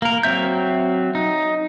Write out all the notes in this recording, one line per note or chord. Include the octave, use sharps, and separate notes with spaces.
A#3 A#4
F#3 C4 E5 G6
D#4